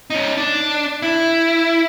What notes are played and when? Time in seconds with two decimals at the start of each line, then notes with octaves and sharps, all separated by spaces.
0.10 C#4 D#4
0.38 D4
1.02 E4